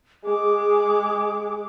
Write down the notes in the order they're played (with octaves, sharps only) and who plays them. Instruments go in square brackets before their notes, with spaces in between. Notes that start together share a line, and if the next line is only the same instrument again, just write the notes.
[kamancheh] G#3 D6 [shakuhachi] G#4